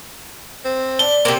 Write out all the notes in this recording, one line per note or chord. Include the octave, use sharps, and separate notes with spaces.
C4
D4 G7
C3 A#3 C4